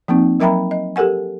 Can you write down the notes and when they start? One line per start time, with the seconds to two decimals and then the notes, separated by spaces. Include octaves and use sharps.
0.08 F3 A#3 C4 D#4
0.40 F#3 A#4 E5 G5 A#5 B5
0.71 D#5
0.96 G4 A4 A#4 F#5 G#5